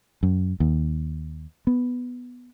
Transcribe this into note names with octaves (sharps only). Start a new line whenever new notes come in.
F#2
D#2
B3